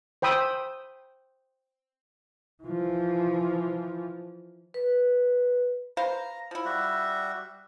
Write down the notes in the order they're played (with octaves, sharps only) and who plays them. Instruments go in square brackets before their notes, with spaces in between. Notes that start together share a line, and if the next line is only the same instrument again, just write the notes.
[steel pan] C5 G5 B5 D#6 E6
[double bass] E3 F3
[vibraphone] B4
[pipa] B4 C5 F5 [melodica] A#5
[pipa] F3 E4
[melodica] G3 F#4 E5